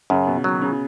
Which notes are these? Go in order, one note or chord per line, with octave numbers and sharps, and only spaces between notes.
F#2 C#3
B2
B2 D#3 F#3
C#3